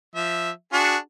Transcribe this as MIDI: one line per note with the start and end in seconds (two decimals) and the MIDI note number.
0.15 0.51 53
0.15 0.51 76
0.73 0.96 62
0.73 0.96 66
0.73 0.96 68